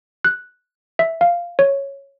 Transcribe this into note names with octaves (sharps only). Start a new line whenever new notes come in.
F#6
E5
F5
C#5